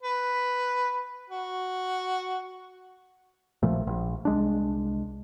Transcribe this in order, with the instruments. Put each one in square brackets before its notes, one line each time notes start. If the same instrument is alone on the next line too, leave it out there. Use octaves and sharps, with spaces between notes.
[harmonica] B4
F#4
[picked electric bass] A#1 A#2 F3 A3
A#1
C2 G#3 D4